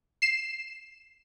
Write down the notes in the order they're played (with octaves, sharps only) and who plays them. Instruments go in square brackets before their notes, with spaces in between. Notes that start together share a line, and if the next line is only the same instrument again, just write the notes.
[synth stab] C7 E7